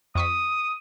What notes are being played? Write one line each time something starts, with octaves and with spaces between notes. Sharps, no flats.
F2 C#6 D#6 B6